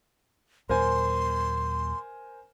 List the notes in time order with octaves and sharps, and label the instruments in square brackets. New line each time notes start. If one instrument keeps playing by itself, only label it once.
[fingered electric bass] D#2 A#2 F#3 [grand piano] A#4 C5 G#5 [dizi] C6